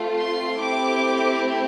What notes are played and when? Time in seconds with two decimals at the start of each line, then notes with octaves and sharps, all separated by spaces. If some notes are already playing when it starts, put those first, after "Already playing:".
Already playing: A3 C4 F4
0.18 C6
0.59 A3 C4 E4 G4 D6